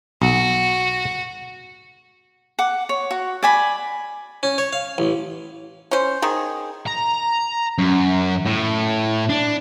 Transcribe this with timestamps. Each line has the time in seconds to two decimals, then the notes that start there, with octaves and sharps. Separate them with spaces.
0.22 B1 F#4
2.59 F#5 D6
2.89 C#5
3.11 F#4
3.43 D5 G#5 B5
4.43 C#4
4.58 C#5
4.73 F5
4.98 A1
5.91 C#4 C5
6.22 D#3 G#4
6.86 A#5
7.78 F#2
8.45 A2
9.29 D4